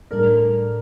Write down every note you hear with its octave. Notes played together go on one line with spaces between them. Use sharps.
A2 G3 D4 A4 A#4 D5